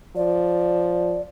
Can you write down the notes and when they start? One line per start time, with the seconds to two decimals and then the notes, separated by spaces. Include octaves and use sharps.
0.16 F3 D5